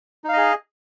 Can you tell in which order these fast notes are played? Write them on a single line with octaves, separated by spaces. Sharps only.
D#4 F5 D#5 G#4